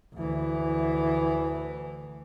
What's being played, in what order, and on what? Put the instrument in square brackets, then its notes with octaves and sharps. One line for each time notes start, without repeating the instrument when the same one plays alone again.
[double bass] D2 E3